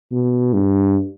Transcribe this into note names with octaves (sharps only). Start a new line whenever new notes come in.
B2
G2